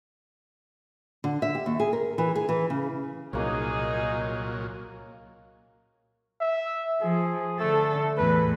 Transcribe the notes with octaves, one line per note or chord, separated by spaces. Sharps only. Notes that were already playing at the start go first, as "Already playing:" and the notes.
D3
E5
G4
D#2
G#4
A#4
E3
G#4
E3
C#3
C2 A#2 F#3 A#3 C#4 D#4 G#4
E5
F3 G#4
D3 A3 A4
E2 A2 B4